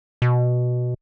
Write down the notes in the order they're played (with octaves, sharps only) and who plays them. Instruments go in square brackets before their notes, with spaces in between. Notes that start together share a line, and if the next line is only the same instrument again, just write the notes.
[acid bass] B2